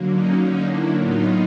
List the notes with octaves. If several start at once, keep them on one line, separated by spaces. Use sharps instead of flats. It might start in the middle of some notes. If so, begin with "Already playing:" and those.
Already playing: D3 F#3 A#3
C#4 D#4
C#4 D#4
D4 E4
A2 F#3 B3 D#4 F4